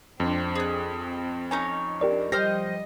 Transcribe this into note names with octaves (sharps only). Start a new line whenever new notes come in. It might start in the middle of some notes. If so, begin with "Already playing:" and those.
F2 C4 D4 C5
C4 G#4 F#6
C#4 D#4 C#5 G#5
C4 D4 G4 A#4 D5
F3 G3 G4 C5 D#5 G5 F6 A#6